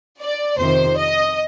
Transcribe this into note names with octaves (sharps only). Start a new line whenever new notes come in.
D5
F2 C3 D#3 C5
D#5